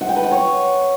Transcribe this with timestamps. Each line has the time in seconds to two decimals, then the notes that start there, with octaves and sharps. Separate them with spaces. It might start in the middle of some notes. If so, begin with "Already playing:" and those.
0.01 F#5
0.08 G5
0.16 B4
0.24 F#5
0.31 C#5